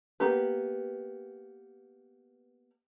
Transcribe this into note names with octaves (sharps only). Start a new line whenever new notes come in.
A#3 B3 G4 B4